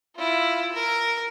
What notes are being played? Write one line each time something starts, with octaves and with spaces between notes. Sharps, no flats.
E4 F4
A#4